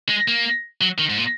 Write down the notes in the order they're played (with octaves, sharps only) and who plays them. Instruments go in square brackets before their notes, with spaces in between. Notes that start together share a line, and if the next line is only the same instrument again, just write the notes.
[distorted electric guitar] G#3
A#3
F#3
D#3
G#2
A#2